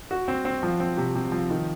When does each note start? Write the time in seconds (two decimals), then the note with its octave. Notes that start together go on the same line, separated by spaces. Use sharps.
0.11 F#4
0.28 C4
0.45 C4
0.63 F3
0.80 C4
0.97 C3
1.15 C3
1.32 F3
1.50 D#3